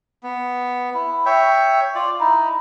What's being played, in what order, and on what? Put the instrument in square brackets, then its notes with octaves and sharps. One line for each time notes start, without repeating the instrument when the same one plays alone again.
[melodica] B3
E4
C#5 E5 G5
F4 D5
D#4 E4